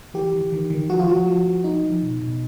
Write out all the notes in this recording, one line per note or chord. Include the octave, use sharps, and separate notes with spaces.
E3 G4
E3
D#3
D#3
F3 F#4
F4
F3 F#4
F3
F3
F3 D#4
F3
B2
B2